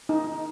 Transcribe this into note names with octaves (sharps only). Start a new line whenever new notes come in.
D#4